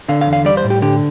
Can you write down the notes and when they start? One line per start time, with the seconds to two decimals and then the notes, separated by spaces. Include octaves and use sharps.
0.09 D3 F5
0.21 F5
0.27 E2
0.33 F5
0.45 G3 D5
0.57 C5
0.64 A2
0.70 G4
0.82 D3 G4